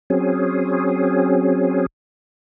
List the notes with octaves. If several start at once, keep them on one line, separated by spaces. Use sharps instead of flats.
F#3 C4 C#4 G#4